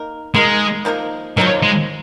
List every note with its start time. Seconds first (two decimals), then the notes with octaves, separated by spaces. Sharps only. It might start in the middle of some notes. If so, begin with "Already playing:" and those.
Already playing: A#3 D#4 A#4
0.34 G#3 A#3 D#4 A#4
0.85 F3 A#3 D#4 A#4
1.37 F3 F#3 A#3 D#4 A#4
1.62 G#3